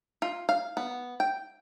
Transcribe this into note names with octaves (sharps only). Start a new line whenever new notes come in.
F4
F5
B3
G5